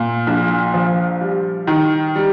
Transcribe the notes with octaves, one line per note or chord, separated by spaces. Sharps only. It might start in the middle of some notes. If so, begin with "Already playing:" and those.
Already playing: A#2
A#1
F3
G3
D#3
G3